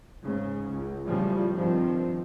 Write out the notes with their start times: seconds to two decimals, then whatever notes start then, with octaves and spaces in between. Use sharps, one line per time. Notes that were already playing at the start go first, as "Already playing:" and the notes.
0.24 G#2 C#3
0.71 C#2
1.06 A2 C#3 F3 G3
1.52 G2 D#3 F3 C4